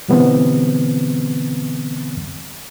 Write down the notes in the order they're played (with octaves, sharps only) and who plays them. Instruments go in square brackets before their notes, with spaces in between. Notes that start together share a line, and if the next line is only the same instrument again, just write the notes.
[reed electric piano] B2 D3 E3 G3 B3 C4